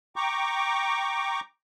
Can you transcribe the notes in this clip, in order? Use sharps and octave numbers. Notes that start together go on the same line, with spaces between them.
G5 A#5 C#6 D6